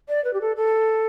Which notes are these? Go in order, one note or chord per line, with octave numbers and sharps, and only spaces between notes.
D5
B4
G4
A4
A4